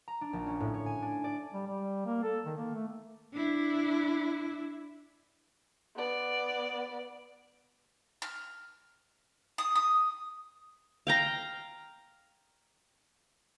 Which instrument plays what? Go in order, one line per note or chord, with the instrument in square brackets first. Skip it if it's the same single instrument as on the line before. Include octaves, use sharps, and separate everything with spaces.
[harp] A#5
D4
A#1
C#4
A2
C#5
G#5
D4
D5
[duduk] G3
G3
A#3
A4
D#3
A#3
A3
[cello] D4 E4
[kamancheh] B3 D5
[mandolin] F6
D#6
D#6
[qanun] F5 G5 A#5